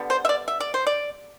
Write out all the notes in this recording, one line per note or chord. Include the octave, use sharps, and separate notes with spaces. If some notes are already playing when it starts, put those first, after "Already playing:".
Already playing: D3 G3 B3
C5
E5
D5
E5
D5
C5
D5